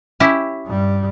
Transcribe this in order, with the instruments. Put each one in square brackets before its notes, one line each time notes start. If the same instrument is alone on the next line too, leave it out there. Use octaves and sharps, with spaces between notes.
[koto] C#4 E4 G4
[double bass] G2 G3